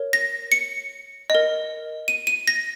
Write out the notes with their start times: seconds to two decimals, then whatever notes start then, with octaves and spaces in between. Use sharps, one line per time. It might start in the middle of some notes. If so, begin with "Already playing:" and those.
Already playing: A#4 C#5
0.13 A#6
0.52 C#7
1.30 A#4 D#5
2.08 D#7
2.27 D#7
2.48 A#6